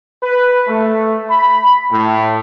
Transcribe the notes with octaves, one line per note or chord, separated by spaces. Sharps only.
B4
A3
B5
A2